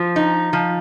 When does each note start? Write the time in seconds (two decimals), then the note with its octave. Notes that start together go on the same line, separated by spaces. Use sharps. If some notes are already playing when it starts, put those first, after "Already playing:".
Already playing: F3
0.16 D#4
0.53 F3